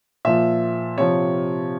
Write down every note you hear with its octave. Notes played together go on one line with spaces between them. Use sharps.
A#2 F3 E5
C3 F3 C#5